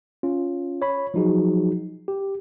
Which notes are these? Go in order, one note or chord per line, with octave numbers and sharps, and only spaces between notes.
C#4 F4
C#5 B5
F3 F#3 D#4 F#4 G#4
G4